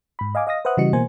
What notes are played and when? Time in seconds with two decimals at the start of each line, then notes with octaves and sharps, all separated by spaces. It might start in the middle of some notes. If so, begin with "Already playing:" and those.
0.19 G#2 B5
0.35 D#5 F5 G#5 D6
0.47 D#5 F5 D#6 A#6
0.65 B4 C5 E5 F#5 D#6 F#6
0.77 C#3 E3 G3 F#4 D#5 C#7
0.93 B2 E3 A#3 C5 G#5